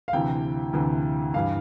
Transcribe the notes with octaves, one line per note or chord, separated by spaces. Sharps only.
F5
D2 C3 E3 G5
D2 C3 E3
G2 E3 F5